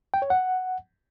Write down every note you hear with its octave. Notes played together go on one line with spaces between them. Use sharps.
G5
C#5
F#5